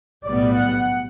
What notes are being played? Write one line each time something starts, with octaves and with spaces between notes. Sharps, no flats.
B1 A2 G3 B3 D5
F#5